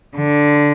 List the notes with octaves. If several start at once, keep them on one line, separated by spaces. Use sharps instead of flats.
D3